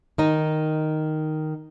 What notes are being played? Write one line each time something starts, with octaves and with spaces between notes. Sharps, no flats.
D#3 D#4